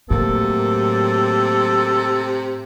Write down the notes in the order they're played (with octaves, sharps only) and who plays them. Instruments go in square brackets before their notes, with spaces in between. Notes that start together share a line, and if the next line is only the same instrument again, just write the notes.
[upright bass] A2 [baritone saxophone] C3 [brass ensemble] F#3 A#3 [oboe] A4